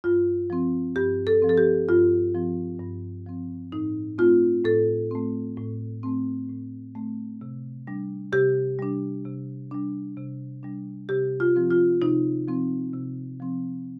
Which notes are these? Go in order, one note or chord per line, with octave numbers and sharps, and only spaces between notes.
G2 F4
F3 C4
G2 G4
A4
F3 C4
A4
G4
G2 F4
F3 C4
G2
F3 C4
A2 D#4
A3 C4 F4
A2 A4
A3 C4
A2
A3 C4
A2
A3 C4
C3
G3 D4
C3 G4
G3 D4
C3
G3 D4
C3
G3 D4
C3 G4
F4
F3 C4
F4
C3 D#4
F3 C4
C3
F3 C4